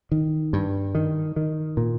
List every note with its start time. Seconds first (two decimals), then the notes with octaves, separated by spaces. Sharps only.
0.12 D#3
0.53 G2
0.95 D#3
1.36 D#3
1.77 A#2